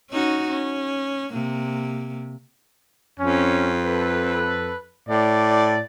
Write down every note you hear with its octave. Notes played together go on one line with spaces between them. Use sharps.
C#4 D#4 F#4
C#4
C3 A#3
F2 C#4
A4 B4
A2 D5